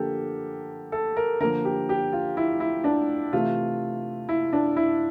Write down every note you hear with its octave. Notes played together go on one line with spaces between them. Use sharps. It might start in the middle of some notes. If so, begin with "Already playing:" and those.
Already playing: D3 F3 A#3 G4 A4
A4
A#4
D3 F3 A#3 A#4
G4
G4
F4
E4
E4
D4
C3 E3 A3 F4
E4
D4
E4